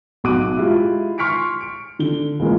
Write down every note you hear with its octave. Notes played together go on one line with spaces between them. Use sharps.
B1 F#4 D6 F#6 D#7
G#3 E4 F4 G4 E5
C6 C#6 F6 B6 C#7 D7
D7
D3 G7
C#2 E3 G#3 A#3